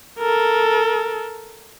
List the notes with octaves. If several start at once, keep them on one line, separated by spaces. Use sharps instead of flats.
A4 A#4